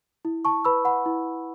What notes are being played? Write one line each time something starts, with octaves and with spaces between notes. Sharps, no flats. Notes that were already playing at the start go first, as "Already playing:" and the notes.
E4
A5 C#6
B4 B5 E6
F#5 B5
E4